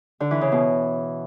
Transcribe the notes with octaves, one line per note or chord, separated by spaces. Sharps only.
D3
E3
C#3
B2